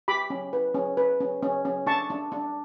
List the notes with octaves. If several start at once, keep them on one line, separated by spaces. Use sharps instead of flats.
G4 B5 D6
C#4
B4
C#4
B4
C#4
C#4
C#4
D4 A5 C#6
D4
D4